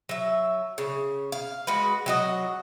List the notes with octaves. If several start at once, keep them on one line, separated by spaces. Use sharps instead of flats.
F#3 E5
C#3
F5
G#3 F#4 B4
F#3 F#4 D#5